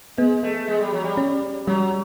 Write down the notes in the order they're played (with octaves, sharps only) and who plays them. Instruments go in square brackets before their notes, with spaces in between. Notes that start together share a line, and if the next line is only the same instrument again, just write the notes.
[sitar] G#3 [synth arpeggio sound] B3
[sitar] A3
G#3
G3
F#3
G3
[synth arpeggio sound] C#4
[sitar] F#3 [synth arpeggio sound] G3